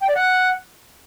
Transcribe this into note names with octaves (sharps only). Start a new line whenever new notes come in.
G5
D5
F#5